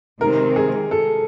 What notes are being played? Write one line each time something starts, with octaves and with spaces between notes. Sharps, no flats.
C3 D#3 G#3 C4 A#4
G#4
A4